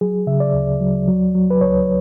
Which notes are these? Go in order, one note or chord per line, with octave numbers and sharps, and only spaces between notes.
F#3 G#4
C#3 E5
D5
D2
F#3
F#3
F#3
B4
C#2 C#5